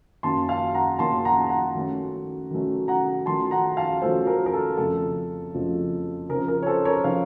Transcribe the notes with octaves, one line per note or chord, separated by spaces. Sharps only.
F#2 D#3 A#3 C#4 A5 C6
F5 A5
F#5 A#5
F#2 D#3 A#3 C#4 A5 C6
F#5 A#5
A5
F#5 A#5
D#3 F#3 A3 C#4
D#3 F#3 A3 C#4
F#5 A#5
D#3 F#3 A3 C#4 F4 A5 C6
F#5 A#5
F5 A5
D#3 F#3 A3 C#4 F4 A4 C5
A#4
A#4
A4
F2 C#3 F3 A3 A4
F2 C#3 F3 A3
C#3 F3 C4 D#4 A#4
A#4
C#5
A4 C5
A#4 C#5
C#3 F3 C4 D#4 C#5 F5